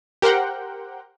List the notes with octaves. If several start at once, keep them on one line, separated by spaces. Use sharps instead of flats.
G4 A#4 C5 F#5 G5